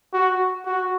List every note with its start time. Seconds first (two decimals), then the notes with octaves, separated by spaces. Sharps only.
0.13 F#4
0.66 F#4